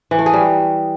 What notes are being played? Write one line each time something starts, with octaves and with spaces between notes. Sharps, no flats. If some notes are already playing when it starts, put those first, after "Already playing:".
E3
A3
G#4
G3